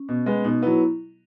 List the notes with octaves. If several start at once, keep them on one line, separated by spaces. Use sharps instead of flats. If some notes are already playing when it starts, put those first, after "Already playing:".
Already playing: C#4
B2
G#3 B3
B2 D#4
F#3 B3 E4